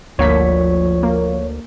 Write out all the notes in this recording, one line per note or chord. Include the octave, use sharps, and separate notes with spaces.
G1 D2 F3 A#3 C#5 B6
A#3